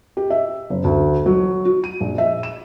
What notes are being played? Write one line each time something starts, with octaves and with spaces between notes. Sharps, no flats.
G4
E5
F#1
D2
F#3
F#4
D#7
A#1
E5
E7